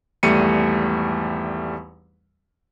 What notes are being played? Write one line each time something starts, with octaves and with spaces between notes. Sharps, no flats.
G#1 E2 G3 A3 C#7 D#7